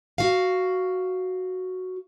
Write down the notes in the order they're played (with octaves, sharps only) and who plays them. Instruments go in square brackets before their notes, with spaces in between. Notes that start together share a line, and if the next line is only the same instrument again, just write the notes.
[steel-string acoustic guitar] F#4 F5